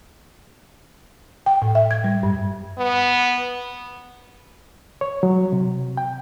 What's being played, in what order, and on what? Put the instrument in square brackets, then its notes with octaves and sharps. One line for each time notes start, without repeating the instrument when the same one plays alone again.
[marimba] G5
A2
E5
G#6
G3
G2
[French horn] B3
[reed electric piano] C#5
F#3
C3
G5